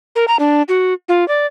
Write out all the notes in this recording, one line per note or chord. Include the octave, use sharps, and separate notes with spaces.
A#4
A#5
D4
F#4
F4
D5